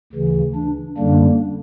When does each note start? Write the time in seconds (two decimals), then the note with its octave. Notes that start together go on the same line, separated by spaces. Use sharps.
0.13 D2 C#3 E3
0.55 D4
0.97 F#2 D3 G3 A#3 D4